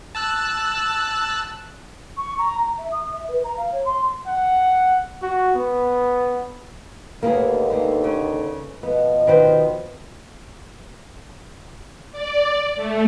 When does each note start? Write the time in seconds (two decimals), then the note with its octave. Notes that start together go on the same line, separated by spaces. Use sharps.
0.15 A5 E6 F#6
2.17 C#6
2.39 A#5
2.58 A#5
2.78 E5
2.92 D#6
3.13 E5
3.28 B4
3.44 A#5
3.57 F5
3.72 C#5
3.85 C6
4.27 F#5
5.22 F#4
5.55 B3
7.23 D#2 D3 A#3 B3 G#4
7.70 A#3 B3
8.04 C#3
8.83 B2 F3 B3 D#5
9.27 D#3 B4 C5
12.12 D5
12.76 A3